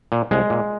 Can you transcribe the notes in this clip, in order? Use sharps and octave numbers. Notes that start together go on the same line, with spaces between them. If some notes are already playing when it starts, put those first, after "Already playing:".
A#2
C2 G#3
A#2